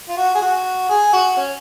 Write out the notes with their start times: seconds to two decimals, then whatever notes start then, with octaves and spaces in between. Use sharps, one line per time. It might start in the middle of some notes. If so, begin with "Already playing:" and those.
0.09 F4
0.17 F#4
0.35 G#4
0.42 F#4
0.89 G#4
1.13 F#4
1.37 C#4